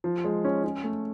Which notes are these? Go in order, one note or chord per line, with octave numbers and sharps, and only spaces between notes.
F3
G#3
C#4
C#4
A3